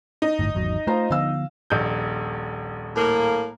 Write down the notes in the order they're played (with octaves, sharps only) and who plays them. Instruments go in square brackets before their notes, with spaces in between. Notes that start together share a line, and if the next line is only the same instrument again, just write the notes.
[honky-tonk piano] D#4
[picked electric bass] G1 A2
G#1 E2 F#3
[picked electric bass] A3 [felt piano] F4 C5 A#5
[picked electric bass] D3 F3 B3 [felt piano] F5 E6
[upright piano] D#1 A#1 G6
[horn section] A2 A#3